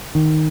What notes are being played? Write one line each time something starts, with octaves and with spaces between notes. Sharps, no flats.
D#3